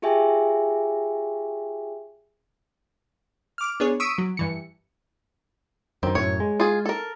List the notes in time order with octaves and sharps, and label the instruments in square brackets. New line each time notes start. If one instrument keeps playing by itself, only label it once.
[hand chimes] F4 G4 G#4 E5 G5 G#5
[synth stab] D6 F6
B3 D4 G#4 C#5
C#6 D#6 E6 B6 D7 D#7
F#3
G2 E3 C#7
[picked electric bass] F#2 D#3 [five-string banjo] C4
[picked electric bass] F#2 A2 [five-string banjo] C#5
[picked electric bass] G#3
[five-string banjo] F4 G#4
A4 A#4